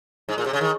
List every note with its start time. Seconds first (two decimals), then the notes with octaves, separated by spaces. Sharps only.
0.29 G#2
0.38 A#2
0.46 C3
0.53 C#3
0.61 D#3